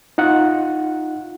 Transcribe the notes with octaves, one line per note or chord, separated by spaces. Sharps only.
D#4 F4 F#5